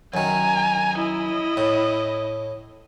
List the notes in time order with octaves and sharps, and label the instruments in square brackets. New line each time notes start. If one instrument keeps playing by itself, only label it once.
[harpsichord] F#2 D#3 [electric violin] G#5 A#5
[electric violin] E4 D#5
[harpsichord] A2